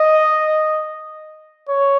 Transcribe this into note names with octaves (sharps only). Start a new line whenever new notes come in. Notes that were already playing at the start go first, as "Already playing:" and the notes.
Already playing: D#5
C#5